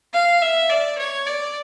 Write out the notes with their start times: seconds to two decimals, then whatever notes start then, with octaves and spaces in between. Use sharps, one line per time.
0.13 F5
0.41 E5
0.70 D5
0.98 C#5
1.26 D5